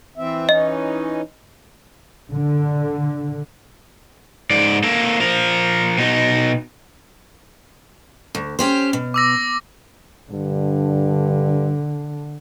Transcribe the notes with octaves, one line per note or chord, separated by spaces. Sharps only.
E3 C4 E5
E3 C#4 D#4 D#5
D3
G#2 D5
A#3 A4
F3 A#4
B2 D#4
D2
C#4 G4 C5
B2
D6 E6 A#6
G2 D3